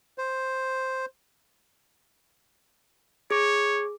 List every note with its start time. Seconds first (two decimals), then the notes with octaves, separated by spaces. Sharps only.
0.18 C5
3.31 G#4 C#5 D6